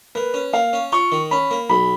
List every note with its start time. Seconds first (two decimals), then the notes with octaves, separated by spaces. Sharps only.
0.15 A#3 B4
0.34 C#4
0.53 A#3 F5
0.73 C#4
0.92 F4 C#6
1.12 D#3
1.31 C#4 B5
1.51 A#3
1.69 B1 B5